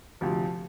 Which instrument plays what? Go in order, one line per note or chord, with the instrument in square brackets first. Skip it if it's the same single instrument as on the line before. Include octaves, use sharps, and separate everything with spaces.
[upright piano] D2 C3 F3